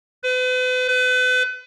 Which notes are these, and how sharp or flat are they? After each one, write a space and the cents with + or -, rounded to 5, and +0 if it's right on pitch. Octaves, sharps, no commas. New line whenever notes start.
B4 +40
B4 +35